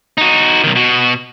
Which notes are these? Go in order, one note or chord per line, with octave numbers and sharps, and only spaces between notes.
D#4 F#4
B1 D#3
B2 F#4